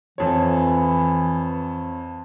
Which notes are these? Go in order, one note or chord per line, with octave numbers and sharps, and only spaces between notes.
F2 E3 C#5